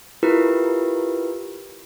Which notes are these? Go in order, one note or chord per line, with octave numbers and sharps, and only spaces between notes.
E4 F4 G4 A#4 B4